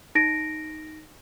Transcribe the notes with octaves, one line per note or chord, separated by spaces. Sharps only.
D#4 A#6 D7